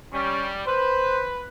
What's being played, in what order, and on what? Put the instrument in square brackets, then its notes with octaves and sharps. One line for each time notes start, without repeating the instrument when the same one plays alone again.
[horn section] G3 [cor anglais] C#4
[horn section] B4 [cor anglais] C5